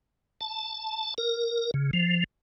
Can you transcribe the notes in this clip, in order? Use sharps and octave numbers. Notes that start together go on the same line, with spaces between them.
A5
A#4
C#3
F3